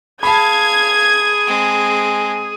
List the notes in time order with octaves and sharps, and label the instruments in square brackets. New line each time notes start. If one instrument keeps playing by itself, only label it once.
[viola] G#4 [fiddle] F5 [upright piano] A5 B5 [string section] G#6
[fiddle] G#3 C4